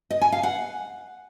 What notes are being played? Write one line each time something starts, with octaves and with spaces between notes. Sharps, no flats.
D#5
G#5
F5
F#5